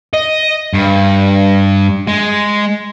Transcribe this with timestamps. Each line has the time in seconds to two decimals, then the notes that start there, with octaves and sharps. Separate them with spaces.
0.14 D#5
0.74 G2
2.08 G#3